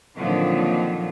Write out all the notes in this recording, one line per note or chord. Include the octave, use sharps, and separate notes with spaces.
F2 A#2 D3 D#3 F3 F#3